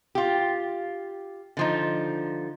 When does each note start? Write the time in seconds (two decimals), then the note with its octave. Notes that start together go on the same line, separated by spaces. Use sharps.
0.15 F4 G4
1.57 D3 F3 D#4